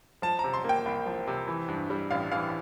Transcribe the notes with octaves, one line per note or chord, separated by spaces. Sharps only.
F3 A5
A#5
C3
C6
A#3 G5
C2
F3
C3
E3
G2
G3
A1 F5
E3 F5